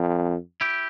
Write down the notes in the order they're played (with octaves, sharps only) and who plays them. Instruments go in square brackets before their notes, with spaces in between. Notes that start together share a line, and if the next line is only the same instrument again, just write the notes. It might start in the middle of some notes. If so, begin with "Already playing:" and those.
Already playing: [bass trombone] F2
[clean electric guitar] E4 G4